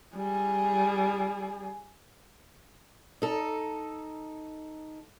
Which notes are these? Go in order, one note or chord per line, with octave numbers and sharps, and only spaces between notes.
G3 G#4
D#4 A4